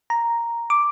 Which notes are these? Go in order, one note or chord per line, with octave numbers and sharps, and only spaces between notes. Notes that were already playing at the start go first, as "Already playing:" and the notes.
A#5
D6